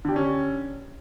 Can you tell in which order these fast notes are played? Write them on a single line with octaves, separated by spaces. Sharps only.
D3 G4 D4 C#4